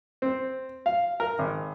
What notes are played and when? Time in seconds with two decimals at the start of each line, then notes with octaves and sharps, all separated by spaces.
0.22 C4
0.86 F5
1.20 A#4
1.39 G#1